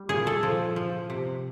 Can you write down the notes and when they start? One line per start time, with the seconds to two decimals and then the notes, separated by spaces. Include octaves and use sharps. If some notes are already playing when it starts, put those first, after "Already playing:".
Already playing: G3
0.09 A#2 G#4
0.27 A4
0.43 F3
0.76 F3
1.10 C3